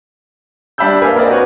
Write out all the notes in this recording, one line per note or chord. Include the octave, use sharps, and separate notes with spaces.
G3 D4 E5 B5 E6 G6
A#3 F5 G#5
A#3 C4 A#4 D5 D#5
F#4 B4 C#5